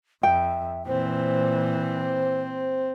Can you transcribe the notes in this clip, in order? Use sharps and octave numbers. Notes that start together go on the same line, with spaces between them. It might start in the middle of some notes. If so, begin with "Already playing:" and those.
F2 E5 G5
A#2 E3 C4 C5